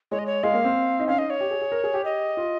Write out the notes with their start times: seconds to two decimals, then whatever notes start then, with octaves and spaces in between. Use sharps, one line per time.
0.11 G#3 C#5
0.19 D#5
0.26 C#5
0.43 G#3 F5
0.54 A#3
0.64 C4
0.99 D#4
1.08 C#4 F5
1.18 D#4 D#5
1.30 C#5
1.41 G4
1.51 G#4
1.62 G#4
1.72 A#4
1.84 G#4
1.94 G4
2.05 D#5
2.37 F4